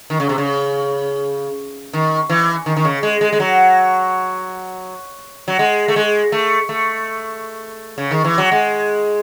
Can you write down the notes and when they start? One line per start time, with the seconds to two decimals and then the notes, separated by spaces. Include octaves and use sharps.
0.10 D#3
0.20 C#3
0.29 C3
0.38 C#3
1.93 D#3
2.30 E3
2.66 D#3
2.77 D#3
2.85 C#3
3.03 G#3
3.21 G#3
3.33 G#3
3.40 F#3
5.48 F#3
5.59 G#3
5.88 A3
5.96 G#3
6.32 A3
6.69 A3
7.98 C#3
8.11 D#3
8.25 E3
8.38 F#3
8.52 G#3